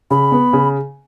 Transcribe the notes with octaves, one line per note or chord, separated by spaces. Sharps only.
C#3 B5
B3
C#3